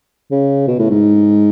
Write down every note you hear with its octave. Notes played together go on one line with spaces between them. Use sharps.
C#3
B2
A2
G#2